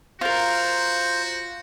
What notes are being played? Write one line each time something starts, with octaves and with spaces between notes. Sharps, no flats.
F4 F#4 A#4 C5